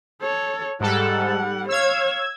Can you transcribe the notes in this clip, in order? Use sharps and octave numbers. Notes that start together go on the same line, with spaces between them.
A4 C#5
G#2 G3 A4 F#5
C#5 F5 E6 G#6